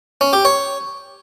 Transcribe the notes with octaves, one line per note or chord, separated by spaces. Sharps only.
C#4
G4
C#5